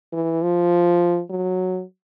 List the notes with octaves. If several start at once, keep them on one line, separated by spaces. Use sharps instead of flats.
E3
F3
F#3